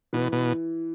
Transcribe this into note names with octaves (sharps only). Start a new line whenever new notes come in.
B2 E3
B2